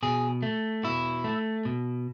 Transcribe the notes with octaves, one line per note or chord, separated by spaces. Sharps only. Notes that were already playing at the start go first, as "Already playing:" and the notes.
B2 G#4
A3
B2 E4
A3
B2